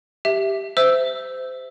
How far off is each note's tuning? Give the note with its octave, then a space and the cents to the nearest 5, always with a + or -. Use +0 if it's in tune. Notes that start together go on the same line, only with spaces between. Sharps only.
G4 +0 E5 +0
C5 -25 E5 +0 E6 +0